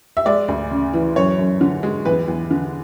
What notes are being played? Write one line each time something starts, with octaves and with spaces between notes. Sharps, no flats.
E5
G#3 D5
D2
C#3
E3
F#2 C#5
F#2
D3
G#3
E2 B4
E2
D3